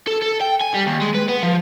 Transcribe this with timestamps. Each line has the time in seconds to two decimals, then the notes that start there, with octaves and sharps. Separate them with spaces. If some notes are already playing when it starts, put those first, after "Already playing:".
0.07 A4
0.23 A4
0.42 G5
0.62 G#5
0.75 G3
0.87 D#2
1.02 G#3
1.15 B4
1.29 B3
1.43 F3